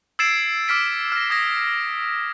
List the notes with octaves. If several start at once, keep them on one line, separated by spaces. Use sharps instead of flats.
E6 G#6 A6 C7 D7 E7
D6 F6 B6 D7
F6 A#6
D#6 G#6 A#6